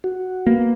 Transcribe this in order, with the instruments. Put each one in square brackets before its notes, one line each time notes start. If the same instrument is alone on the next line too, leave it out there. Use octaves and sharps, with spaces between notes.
[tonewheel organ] F#4
[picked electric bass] A#3 [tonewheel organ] B3